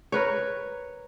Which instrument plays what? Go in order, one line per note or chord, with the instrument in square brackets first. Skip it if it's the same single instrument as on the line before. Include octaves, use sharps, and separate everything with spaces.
[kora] A#4 B4 C#5